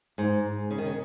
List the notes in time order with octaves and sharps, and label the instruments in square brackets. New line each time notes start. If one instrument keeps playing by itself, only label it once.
[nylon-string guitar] G#2
C#3
D#3
C#3